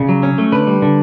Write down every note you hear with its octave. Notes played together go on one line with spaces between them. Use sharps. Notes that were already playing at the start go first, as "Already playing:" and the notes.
Already playing: C#3 D5
F#3
C#4
A3
D3 B4
G3
D3